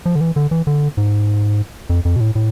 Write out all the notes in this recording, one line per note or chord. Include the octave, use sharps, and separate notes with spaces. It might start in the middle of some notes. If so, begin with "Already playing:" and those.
F3
D3
E3
D3
E3
D3
G#2
F2
F2
B2
A2
A2